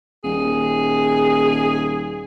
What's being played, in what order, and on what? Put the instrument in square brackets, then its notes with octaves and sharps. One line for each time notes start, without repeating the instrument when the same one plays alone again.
[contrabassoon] D#1 [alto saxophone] G#4